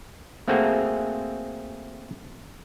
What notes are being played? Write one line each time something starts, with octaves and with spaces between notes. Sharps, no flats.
A3 A#3 C4 F#4 G#4